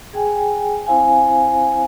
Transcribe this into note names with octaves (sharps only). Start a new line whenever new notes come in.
G#4 G5 G#5
C4 E4 C5 F5 G#5